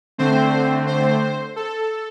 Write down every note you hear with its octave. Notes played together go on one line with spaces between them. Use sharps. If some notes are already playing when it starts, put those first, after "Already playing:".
D3 A3 C4 C5
C5
A4